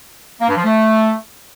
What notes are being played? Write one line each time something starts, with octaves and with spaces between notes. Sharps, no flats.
A#3
G2
F3
A3